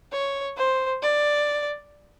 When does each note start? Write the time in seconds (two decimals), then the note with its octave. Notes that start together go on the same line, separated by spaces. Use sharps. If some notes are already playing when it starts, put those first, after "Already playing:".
0.12 C#5
0.57 C5
1.02 D5